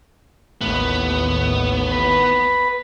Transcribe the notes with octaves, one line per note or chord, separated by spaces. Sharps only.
A1 D#2 A2 B3
B4